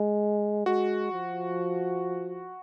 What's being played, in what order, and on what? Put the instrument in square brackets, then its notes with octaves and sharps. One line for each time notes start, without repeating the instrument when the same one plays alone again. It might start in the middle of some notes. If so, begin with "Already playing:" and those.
Already playing: [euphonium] G#3
[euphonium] G#3 [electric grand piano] F#4
[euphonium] F3